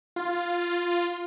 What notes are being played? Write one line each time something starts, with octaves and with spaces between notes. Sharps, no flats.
F4